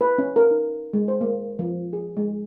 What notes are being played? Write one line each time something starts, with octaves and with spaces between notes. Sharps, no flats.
B4
C#4
A#4
D#4
G#3
C5
A#3
F3
G#4
G#3